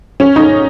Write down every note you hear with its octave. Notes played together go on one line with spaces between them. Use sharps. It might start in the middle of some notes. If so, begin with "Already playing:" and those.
C#4
D#4